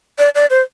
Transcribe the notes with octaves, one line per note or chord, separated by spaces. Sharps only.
D5
D5
C5